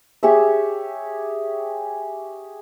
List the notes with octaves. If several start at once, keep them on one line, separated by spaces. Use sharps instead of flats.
G4 G#4 C#5 E5